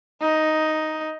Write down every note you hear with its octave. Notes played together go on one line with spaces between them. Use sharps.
D#4